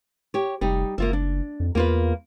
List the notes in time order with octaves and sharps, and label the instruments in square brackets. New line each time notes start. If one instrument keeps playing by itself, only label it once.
[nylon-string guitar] G4 C#5
[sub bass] F1 [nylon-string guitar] G3 D#4
[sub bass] F#1 [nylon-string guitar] A#3 F4 E5
[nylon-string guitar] D4
[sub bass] F2
[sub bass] E2 [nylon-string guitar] A#3 F4 B4